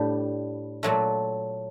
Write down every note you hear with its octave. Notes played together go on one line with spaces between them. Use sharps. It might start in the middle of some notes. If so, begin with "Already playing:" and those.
Already playing: A2 G3 D4 G4
A#2 F#3 A3